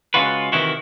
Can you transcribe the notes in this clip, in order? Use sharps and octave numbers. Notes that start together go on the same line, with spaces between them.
C#3 G#3 F4 F#4 B4
C3 D#3 E3 E4 F#4